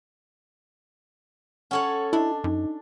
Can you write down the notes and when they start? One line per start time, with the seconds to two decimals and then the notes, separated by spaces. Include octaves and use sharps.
1.71 C#4 A4 C#5 F#5 C#6 F#7
2.13 D4 E4 D#5 A5
2.44 F#2 D#4 D#5 D6